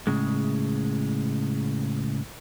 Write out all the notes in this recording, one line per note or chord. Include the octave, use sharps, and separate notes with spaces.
A2 C#3 G#3